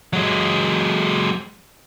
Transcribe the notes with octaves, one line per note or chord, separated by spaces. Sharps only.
F#3 G#3